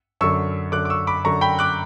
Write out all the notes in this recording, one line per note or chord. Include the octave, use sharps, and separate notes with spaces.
F#2 D3 C#6 E6
F#2 D3 D6 F#6
D6
C#6 E6
B5 D6
F#2 D3 A#5 C#6
G5 B5
D6 F#6